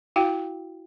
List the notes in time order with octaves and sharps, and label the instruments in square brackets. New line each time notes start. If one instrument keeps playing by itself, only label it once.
[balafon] E4 F#4 F5 G5